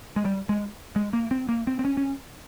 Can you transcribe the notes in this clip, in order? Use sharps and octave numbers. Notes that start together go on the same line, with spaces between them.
G#3
G3
G#3
G#3
A#3
C4
A#3
C4
C4
C#4
C#4